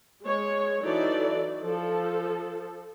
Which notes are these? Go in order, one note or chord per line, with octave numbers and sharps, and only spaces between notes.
G#3 C#5
E3 F#3 D#4 A4 D5
F3 A4